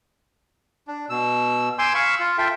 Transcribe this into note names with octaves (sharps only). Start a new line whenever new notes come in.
D4
B2 E6
G#5 C6 D6 E6 G6
F5 B5 C#6 E6
F4
F4 A4 E5 G5